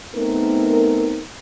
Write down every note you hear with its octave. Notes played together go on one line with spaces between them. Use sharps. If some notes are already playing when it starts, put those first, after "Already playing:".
A3 B3 C4 D#4 A#4